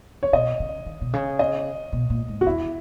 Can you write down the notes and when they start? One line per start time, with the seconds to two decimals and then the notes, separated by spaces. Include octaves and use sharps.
0.23 C#5
0.33 B2 D#5
0.60 C#3
0.86 D#3
1.01 B2
1.13 C#3
1.39 D#5
1.93 B2
2.10 A#2
2.28 G#2
2.41 F#4
2.46 E2 E4